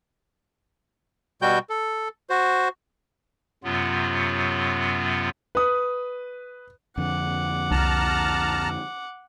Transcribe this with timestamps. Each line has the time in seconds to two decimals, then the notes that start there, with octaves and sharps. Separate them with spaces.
1.42 B2 G3 F#4 G5 G6
1.70 A4
2.30 F#4 C5
3.64 F#2 C3 F#3 B3 F4
5.55 B4 D#6
6.98 F2 D3 F#5 D6
7.71 C2 A5 A#5 F6